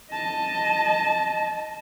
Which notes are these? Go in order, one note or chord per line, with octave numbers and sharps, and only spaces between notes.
D#5 A5